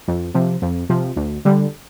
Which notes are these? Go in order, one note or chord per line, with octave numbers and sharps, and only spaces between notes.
F2
C3 F3
F2
C3 F3
D2
D3 G3